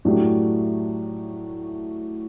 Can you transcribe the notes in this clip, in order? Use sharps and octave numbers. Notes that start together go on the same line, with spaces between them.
A2 F#3 A3 D4 G4